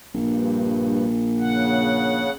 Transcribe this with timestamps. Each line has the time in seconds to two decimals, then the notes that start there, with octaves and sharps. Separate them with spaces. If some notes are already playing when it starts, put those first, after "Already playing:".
0.14 A#1 G2
1.39 C#3 F#5